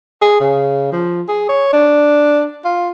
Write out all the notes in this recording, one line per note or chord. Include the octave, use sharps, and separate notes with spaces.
G#4
C#3
F3
G#4
C#5
D4
F4